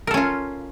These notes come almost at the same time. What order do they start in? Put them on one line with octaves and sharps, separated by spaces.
A#4 A4 C#4 F4